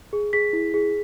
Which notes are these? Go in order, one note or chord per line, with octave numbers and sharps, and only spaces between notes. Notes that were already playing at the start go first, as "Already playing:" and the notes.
G#4
G#4 B6
E4
G#4